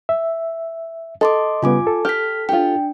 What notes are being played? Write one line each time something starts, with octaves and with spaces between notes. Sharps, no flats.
E5
A4 D#5 C6 D6
C#3 G3 B3 F4 G#5 D6
A4
G4 F6 B6
D4 F4 G4 G5